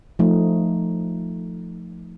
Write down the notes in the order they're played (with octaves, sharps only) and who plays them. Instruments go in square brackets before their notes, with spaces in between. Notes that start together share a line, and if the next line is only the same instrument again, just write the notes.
[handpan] F3 A3 D#4